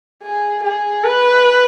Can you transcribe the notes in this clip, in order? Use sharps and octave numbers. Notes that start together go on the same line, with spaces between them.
G#4
G#4
B4